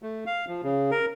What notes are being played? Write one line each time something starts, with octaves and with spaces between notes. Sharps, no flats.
A3
F5
F3
C#3
A#4